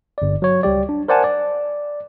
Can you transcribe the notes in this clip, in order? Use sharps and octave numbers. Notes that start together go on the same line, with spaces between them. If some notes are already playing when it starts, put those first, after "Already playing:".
G1 D5
F#3 C#5
C#2 G3 G4 D5
D4
A#4 C5 D5 F#5 G#5 A5
D5